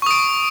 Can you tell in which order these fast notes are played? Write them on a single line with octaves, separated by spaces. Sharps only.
C#6 D#6 D7